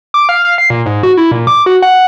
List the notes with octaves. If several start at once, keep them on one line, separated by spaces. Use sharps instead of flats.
D6
F5
F5
C7
A#2
G#2
F#4
E4
A#2
D6
F#4
F#5